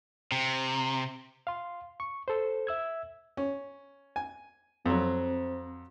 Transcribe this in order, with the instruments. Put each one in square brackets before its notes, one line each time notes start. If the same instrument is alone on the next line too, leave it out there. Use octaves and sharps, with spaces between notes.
[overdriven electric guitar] C3
[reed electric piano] F5 C6
C#6
A4 C5
E5 E6 G#6
[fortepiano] C#4
G#5
[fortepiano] F2 F#3 [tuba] C4